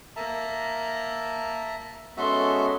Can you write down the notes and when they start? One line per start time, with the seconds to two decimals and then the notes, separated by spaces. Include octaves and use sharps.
0.16 A#3 E5 A5 A#5
2.17 G#3 B3 C#4 F#4 A4 E5 C6